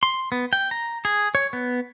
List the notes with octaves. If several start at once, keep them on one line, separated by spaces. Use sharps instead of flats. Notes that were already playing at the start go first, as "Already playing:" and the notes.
C6
B3
G5
A#5
G#4
C#5
B3